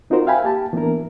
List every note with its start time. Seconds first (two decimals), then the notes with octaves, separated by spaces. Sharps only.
0.10 C4 D#4 F4 F#4 A#4 C5
0.26 E5 F5 G5 G#5 B5
0.44 A#3 G4 A5
0.73 E3 A#3 B3 D4 E4 A#4